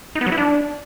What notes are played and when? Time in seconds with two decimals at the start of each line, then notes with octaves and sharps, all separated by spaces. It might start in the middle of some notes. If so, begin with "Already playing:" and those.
0.15 D#4
0.21 B3
0.27 F#3
0.32 E4
0.38 D4